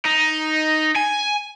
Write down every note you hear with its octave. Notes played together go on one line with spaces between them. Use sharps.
D#4
G#5